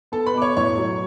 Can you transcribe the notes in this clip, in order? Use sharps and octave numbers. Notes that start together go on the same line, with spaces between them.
B3 A4 A5
B4 B5
B2 D6
C#5 C#6
A2 C#5 C#6
F#3